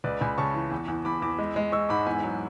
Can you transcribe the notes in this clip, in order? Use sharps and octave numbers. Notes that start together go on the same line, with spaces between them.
C#2 B4 D5
C#2 G#5 B5
C#3 A5 C#6
E3
E2
E2
E2 B5 D6
E2 B5 D6
G#3
G#3
G#3 C#6 E6
G#2 B5 D6
E2 G#5 B5
F#3